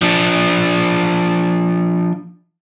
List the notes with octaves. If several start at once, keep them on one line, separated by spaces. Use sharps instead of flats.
F3 D4